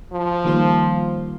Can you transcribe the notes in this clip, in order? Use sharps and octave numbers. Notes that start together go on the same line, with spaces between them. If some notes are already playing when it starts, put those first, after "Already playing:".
F3
D#3 G3 A#3 F4 C5